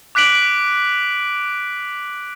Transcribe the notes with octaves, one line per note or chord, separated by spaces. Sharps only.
D6 F#6 B6 D7 F#7